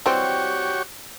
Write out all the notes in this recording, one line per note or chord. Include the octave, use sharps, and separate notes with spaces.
E3 G3 C4 F#4 G4 C#5